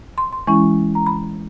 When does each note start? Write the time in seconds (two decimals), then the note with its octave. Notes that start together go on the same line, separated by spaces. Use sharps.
0.18 C6
0.33 C6
0.47 E3 G#3 C#4 E4 C#6
0.95 A#5
1.07 B5